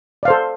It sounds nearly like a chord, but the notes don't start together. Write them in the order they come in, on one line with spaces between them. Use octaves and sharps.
D5 F5 C5 A4